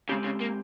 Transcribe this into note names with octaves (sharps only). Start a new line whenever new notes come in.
C#3 G#3 C4 G4
C#3
A#3